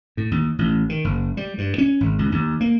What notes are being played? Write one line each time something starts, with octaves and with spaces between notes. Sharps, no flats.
A2
D#2
A1
D#3
F#1
G3
G2
C#4
G#1
C#2
D#2
A#3